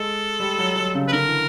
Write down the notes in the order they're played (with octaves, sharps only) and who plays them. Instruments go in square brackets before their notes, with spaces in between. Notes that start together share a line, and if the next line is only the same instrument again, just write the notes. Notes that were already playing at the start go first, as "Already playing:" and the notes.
Already playing: [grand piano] G#3 [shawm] A4
[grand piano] G3
F#3
F#3
C#3
[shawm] B4
[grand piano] D3 [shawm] A#4
[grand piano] E3